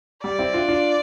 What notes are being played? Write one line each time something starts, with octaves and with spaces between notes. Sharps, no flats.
G3 D5
C4 E4
D4 F4
D4 F4